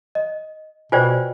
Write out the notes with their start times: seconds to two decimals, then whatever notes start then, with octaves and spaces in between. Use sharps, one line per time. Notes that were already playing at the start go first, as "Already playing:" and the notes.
0.15 D#5
0.92 B2 F4 B4 C5 D5 G5 G#5